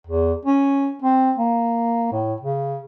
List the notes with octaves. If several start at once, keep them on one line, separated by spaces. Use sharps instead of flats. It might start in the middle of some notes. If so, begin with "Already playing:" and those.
E2
C#4
C4
A#3
A2
C#3